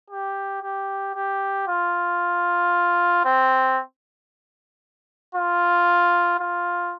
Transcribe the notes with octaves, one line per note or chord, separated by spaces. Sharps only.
G4
G4
G4
F4
C4
F4
F4